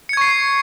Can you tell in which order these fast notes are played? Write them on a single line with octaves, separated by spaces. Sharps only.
C#7 G#6 C#6 C7